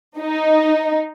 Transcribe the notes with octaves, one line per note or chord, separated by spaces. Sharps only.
D#4